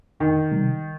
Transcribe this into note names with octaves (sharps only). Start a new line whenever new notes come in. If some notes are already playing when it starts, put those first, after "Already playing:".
F2 D#3
C3 G3